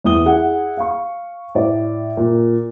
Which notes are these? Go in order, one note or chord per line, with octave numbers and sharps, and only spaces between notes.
E2 E3 D#6 G7
E4 G#4 F#5
F5 C#6
A2 D5
A#2